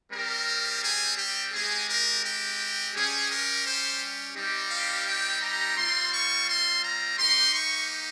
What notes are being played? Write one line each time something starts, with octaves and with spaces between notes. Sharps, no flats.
G3 C4 G4 A#4
G#4
G4
G#3 C4 G4 G#4
A#4
G4
G3 C#4 G4 G#4
A#4
C5
G3 C4 D#4 G4
F5
G5
A#5
G3 C4 F4 C6
C#6
C6
A#5
A#3 D#4 G4 C6
C#6